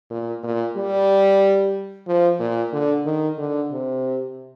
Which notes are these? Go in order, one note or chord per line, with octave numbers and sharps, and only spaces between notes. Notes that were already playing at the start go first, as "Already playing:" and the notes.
A#2
A#2
G3
F3
A#2
D3
D#3
D3
C3